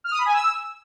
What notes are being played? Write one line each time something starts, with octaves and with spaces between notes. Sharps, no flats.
F6
D#6
B5
G#5
E6